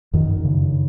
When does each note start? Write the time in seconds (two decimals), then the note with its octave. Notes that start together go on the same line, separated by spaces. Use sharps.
0.13 F#2 D#3
0.45 C#3